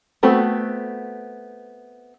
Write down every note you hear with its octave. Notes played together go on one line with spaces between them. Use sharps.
A3 B3 C4 F#4